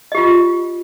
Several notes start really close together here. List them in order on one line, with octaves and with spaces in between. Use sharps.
D#5 G4 F4